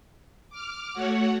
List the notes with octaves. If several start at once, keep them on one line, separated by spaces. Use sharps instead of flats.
D6 F6
A3 F#4 C#5 F#5